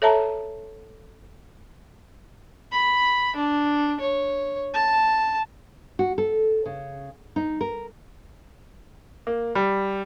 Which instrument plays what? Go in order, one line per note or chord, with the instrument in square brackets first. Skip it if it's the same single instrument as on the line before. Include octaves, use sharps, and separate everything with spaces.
[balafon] A4 C#5 E5 A5 A#5
[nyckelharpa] B5
D4
C#5
A5
[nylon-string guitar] F#4
A4
C#3
D#4
A#4
[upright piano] A#3
G3